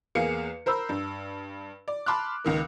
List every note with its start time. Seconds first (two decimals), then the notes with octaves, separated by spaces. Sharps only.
0.15 E2 A#3 G#4 F5 C#7
0.66 A#4 C5 B5 E6
0.89 G2
1.88 D5
2.06 A5 B5 C6 D6 F6 F#6
2.45 C#2 D#3 A#3